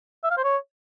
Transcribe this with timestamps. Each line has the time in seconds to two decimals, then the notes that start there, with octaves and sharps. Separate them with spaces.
0.24 E5
0.31 F5
0.37 C5
0.44 C#5